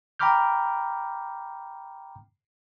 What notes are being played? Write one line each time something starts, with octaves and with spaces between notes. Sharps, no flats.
G5 A#5 B5 D6 F6 G6